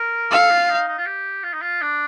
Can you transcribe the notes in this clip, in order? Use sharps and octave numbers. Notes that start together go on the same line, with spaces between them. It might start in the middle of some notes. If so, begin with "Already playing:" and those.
Already playing: A#4
A4 F5
F4
D#4
D#4
F4
G4
F4
D#4
F4
D4